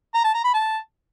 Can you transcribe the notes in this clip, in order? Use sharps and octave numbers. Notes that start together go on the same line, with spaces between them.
A#5
A5
A#5
B5
A5